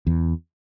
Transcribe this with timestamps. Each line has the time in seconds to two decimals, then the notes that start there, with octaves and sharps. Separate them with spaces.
0.07 E2